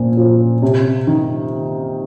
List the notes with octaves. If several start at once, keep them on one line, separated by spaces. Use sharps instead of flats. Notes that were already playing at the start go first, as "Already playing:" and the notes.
Already playing: A#2 F3
F3
C3
D#3